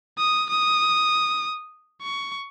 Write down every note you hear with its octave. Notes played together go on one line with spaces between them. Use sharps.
D#6
D#6
C#6